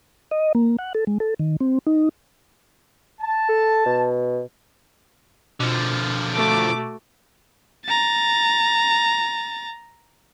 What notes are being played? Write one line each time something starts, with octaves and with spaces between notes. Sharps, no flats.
D#5
A#3
F#5
A4
G#3
A4
D#3
C4
D#4
A5
A4
B2
B2 D3 F3
A3 F#4 D6
A#5 A6